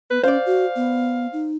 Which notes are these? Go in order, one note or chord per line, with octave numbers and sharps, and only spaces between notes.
B3 B4
C#4 C5 D5 F5
F#4
B3
D#4